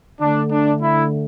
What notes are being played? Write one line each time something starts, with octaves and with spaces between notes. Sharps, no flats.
D3 A3 D4
D4
E4